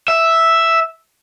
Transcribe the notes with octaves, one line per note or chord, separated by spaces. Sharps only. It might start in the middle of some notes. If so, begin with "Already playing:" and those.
E5